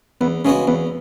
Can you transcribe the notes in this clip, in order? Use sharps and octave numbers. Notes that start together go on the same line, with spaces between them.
E2 B3
C#3 G#3 B3 C#4 F#4
E2 B3